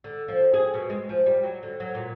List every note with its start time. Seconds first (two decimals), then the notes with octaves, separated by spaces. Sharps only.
0.04 D3
0.28 F3
0.54 G#4
0.74 B2
0.90 G#3
1.09 F3
1.26 G3
1.43 F#3
1.63 D3
1.80 F#3
1.95 A#2